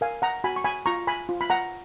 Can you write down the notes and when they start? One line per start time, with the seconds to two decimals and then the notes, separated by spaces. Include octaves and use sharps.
0.01 A#4 F5 G#5
0.22 F#5 A#5
0.44 F#4 G#5 B5
0.56 C#6
0.64 G#5 B5
0.86 F4 A#5 C#6
1.07 G#5 B5
1.29 F4
1.41 B5
1.50 F#5 A#5